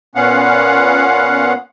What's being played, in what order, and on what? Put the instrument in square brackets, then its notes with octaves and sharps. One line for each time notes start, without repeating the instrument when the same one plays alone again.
[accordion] A#2 B3 C#4 F5 F#5